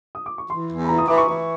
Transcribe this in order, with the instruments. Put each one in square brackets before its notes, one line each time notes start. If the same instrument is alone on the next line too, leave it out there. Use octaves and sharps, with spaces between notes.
[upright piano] D#6
D6
C#6
[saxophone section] E3 [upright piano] C6
[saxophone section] E2
[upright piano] B5
[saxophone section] E3 [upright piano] A#5
[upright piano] D#6
[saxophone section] E3 [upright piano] D6
[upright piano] C#6
[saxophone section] E3